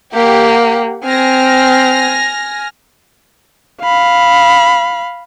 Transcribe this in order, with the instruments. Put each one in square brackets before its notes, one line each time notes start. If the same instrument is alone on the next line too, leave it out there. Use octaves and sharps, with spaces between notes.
[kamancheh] A#3 [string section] G4 F#5
[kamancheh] C4 [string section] G#5 F6 A#6
[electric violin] F5 B5